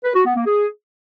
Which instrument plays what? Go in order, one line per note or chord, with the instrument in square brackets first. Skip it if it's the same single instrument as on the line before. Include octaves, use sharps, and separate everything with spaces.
[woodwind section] B4
F#4
B3
A#3
G#4